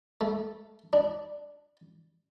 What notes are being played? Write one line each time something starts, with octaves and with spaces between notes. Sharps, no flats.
A3
D4